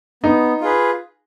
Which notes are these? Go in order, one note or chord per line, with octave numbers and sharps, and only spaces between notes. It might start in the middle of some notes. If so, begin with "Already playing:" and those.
B3 D#4
F4 G#4 B4